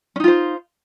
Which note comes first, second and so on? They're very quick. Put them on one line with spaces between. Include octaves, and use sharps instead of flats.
C#4 D#4 F4 C5